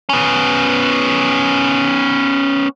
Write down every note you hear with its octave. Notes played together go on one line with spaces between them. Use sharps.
B3 C#4